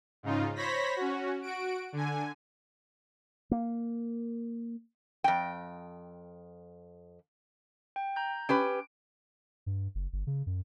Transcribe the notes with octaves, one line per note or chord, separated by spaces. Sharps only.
G#2 C#3 D#4 F4
C5 C#5 B5 A#6 B6
C#4 F#4
F#4 D7
D3 G#5
A#3
F2 G5
G5
A#5 G6
C#4 G4 B4 D7
G2
F#1
G1
C#3
F#2